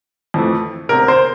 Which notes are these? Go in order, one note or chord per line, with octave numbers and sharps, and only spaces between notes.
F2 E3 A3
E1 D2 C3 A#4
C5